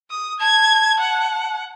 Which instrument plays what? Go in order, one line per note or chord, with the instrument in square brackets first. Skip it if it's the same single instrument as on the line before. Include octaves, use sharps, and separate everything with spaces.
[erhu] D#6
[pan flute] A5 [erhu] G#6
[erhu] F#5